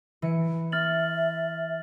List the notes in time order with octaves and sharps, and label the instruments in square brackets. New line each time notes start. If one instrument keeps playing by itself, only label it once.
[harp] E3 C#7 D7
[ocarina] E5 [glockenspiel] F6 A6 F#7